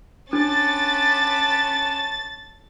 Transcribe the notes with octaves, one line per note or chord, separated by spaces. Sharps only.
C#4 D4 F#5 A5 B5 D6 A6